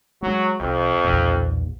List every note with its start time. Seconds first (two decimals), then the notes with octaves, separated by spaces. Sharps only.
0.22 F#3 G#3
0.60 C2 F2
1.04 B1 E2 A#2